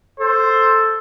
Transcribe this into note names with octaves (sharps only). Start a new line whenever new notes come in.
A4 C5